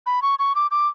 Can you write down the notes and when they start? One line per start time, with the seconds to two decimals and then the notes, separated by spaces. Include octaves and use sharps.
0.06 B5
0.22 C#6
0.39 C#6
0.55 D6
0.71 D6